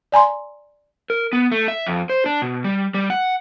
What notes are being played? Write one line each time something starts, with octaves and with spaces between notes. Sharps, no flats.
D5 G#5 A#5 C6
A#4
B3
A3
E5
F2
C5
D4
B2
G3
G3
F#5